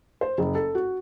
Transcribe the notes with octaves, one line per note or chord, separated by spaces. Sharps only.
C5
F#1
A4
F#4